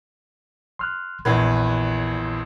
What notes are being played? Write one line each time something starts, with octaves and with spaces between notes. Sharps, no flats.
C6 F6 F#6
A#1 E2 A#2 B4 G#6